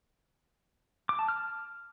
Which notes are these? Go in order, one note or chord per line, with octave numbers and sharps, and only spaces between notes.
D6
A5
F6